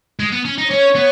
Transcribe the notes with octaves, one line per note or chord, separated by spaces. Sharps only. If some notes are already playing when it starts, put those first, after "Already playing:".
G#3
B3
C#4
D#4
C#4 C#5
B3